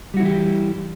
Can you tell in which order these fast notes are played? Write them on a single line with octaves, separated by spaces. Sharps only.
G3 F#4 E4 E3 G4